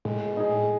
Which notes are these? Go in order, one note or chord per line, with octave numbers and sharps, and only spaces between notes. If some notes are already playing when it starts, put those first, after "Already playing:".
A2 G#3
B2
D#4 G#4
A2